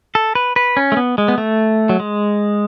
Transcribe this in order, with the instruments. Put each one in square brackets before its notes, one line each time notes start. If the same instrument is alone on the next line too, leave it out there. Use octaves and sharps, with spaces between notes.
[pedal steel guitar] A4
B4
B4
C#4
A3
B3
G#3
B3
A3
F#3
G#3